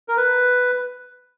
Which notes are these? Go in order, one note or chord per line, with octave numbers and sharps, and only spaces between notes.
A#4
B4